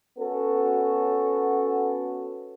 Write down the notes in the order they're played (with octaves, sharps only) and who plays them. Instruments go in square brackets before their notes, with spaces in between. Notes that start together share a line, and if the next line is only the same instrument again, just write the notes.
[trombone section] B3 C#4 F#4 A4